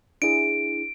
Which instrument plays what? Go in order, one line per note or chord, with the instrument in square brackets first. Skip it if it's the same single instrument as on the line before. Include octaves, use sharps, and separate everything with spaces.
[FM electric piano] D4 E4 G#4 [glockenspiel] D7